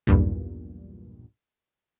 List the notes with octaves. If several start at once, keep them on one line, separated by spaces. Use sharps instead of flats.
B1 E2 G2 A#2